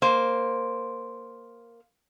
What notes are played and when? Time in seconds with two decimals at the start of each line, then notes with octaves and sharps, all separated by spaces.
0.02 A#3 C5